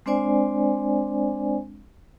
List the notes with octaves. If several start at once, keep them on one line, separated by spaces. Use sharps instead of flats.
G#3 C4 D4 C5 D5 G#5